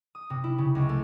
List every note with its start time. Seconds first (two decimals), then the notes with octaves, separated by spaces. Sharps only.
0.15 D#6
0.30 C3
0.44 E4
0.58 C#3
0.75 C#2
0.89 A3